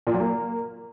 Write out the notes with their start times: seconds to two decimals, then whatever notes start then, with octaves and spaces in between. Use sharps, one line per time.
0.07 A#2
0.13 F#3
0.20 A#3